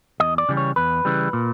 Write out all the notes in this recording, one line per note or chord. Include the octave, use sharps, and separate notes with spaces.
E2 D#5
D5
C#3 E3 G3
C#5
E2 B4
C#3 E3 G3
A#2